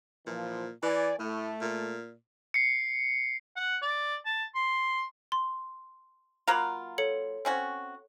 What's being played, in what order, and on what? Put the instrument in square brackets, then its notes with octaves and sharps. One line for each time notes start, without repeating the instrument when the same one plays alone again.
[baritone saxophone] A#2 [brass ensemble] E3 F3
[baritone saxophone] E3 [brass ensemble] D5 G#5
[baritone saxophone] A2 [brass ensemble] A3
[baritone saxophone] A#2
[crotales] C7 C#7
[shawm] F#5
D5
A5
C6
[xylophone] C6
[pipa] F#3 A#3 F4 [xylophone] A#5 B5
[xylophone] A4 C#5 C#7
[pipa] C4 C#4 F#4